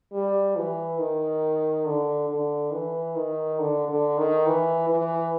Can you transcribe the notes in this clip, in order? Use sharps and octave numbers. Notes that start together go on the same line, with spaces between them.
G3
E3
D#3
D3
D3
E3
D#3
D3
D3
D#3
E3
E3